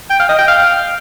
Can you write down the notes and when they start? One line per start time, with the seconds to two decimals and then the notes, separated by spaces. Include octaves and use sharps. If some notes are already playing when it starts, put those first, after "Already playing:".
0.10 G5
0.20 F5
0.29 D#5
0.39 G5
0.48 F5